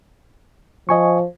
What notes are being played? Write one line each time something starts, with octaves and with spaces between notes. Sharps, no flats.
F3 D#5 G#5 C#6